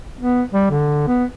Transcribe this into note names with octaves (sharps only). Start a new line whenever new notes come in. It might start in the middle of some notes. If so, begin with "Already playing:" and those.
B3
G3
D3
B3